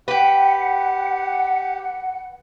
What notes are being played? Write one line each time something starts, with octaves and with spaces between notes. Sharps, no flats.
G4 B4 F#5 G5